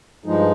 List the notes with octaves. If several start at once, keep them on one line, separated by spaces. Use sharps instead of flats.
G2 F3 G#3 D#4